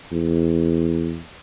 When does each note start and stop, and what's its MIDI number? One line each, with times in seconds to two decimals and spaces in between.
0.12 1.21 40